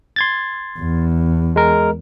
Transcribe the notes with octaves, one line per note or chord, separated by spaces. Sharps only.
C6 G#6 A6
E2
G#3 A#4